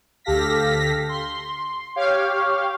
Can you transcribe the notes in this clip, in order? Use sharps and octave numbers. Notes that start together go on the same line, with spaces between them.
D2 G4 A4 F5 A#6 B6
C6
G4 C#5 F5 G5